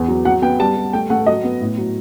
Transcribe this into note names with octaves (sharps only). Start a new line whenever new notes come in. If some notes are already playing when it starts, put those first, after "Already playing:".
Already playing: E2 B3
F#3
F#3 F#5
B3 G5
G3 A5
G3
A3 G5
A3 F#5
F#3 D#5
B3
A2
F#3